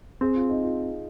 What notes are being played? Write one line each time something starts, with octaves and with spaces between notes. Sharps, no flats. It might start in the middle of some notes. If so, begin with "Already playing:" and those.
C4 G#4
F4
D#4
F4